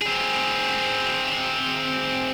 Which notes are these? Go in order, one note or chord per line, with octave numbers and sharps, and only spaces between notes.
C4 G#4